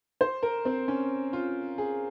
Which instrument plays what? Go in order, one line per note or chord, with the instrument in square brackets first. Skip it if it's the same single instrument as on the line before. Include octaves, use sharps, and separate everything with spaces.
[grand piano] C5
A#4
C4
C#4
F4
G#4